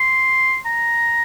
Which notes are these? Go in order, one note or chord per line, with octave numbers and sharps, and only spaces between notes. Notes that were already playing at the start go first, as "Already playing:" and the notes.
Already playing: C6
A#5